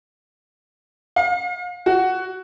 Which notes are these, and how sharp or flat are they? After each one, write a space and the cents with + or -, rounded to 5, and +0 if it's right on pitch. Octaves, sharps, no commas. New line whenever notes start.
F5 +35
F#4 +10